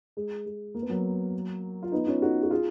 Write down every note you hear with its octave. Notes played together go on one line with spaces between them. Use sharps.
G#3
G#3
A#3
B3
F#3 A#3
F4
B3 D#4
C#4 F4
D#4 F#4
F#4
F4 G#4